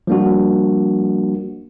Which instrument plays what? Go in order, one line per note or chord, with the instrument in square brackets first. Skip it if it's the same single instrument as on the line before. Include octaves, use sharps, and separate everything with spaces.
[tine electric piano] F3 G3 A#3 D4 F#4